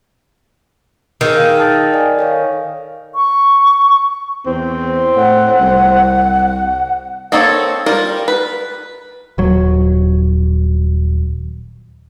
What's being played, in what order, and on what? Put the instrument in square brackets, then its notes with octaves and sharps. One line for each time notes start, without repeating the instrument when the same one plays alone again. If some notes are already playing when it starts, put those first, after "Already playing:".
[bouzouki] D#3 [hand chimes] G#4 E6
[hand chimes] D#4 A#4 F5
A5 D#6 A6
D5 G5 G#5
A4 C#5 F5
[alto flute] C#6
[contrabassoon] E2 [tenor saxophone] C4
[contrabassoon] A2 [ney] F#5
[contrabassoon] C2
[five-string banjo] A#3 C4 D#4 A4 C#5
G3 F4 A#4
B4
[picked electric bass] D#1 F#3